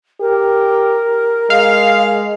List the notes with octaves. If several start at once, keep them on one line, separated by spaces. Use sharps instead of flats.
G4 A#4
G#3 F5